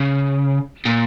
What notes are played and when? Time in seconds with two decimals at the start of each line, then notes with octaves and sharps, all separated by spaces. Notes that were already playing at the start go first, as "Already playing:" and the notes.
Already playing: C#3
0.86 A#2